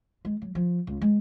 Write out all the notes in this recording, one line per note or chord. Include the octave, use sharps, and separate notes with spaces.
G#3
F#3
F3
C#2
G#3